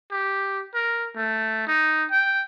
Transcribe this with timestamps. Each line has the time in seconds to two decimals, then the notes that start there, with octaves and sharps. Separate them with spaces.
0.11 G4
0.74 A#4
1.16 A3
1.67 D#4
2.11 G5